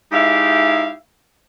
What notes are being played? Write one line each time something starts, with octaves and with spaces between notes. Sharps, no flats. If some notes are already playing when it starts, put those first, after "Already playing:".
G#3 D#4 E4 G4 E5 F5